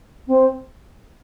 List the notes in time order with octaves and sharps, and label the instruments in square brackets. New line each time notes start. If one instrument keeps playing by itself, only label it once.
[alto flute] C4